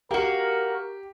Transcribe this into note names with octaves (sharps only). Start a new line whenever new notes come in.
A#3 F#4 G4 A#4